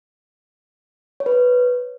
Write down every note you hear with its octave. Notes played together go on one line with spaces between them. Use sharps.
C#5
B4
C#5